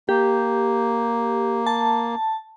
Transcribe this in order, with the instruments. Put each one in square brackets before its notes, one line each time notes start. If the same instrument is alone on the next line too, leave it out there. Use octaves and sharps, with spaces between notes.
[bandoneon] A#3 [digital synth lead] G4
[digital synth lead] A5